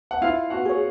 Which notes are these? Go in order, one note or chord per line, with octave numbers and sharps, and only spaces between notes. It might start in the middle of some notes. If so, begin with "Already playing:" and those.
F#5
E4 F4 F5
F#4 F#5
G#4 C#5